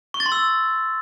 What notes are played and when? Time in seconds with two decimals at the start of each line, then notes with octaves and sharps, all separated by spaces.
0.14 C#6
0.20 A6
0.26 C6
0.32 E6